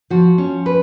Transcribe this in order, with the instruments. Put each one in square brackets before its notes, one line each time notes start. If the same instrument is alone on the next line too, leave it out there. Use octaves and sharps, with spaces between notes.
[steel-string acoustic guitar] F3 [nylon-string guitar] F#4
[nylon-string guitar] C#4
B4